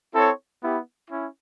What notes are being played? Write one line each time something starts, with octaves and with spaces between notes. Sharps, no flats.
C4 E4 A4 C#5
B3 E4 G4
C#4 E4